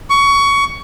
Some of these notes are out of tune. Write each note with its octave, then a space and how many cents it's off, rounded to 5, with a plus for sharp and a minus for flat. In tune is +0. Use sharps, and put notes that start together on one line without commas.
C#6 +20